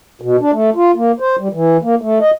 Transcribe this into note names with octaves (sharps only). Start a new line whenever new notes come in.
B2
D4
A3
F4
A#3
C5
G3
E3
A#3
A3
D#5